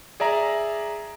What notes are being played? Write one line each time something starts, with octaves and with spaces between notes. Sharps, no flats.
G#4 D5 E5 A#5